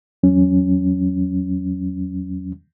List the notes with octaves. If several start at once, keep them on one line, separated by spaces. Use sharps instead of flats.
E2 F#3 C#4